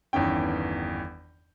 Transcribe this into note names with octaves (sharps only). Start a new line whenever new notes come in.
G1 E2 D#3 C#4 G5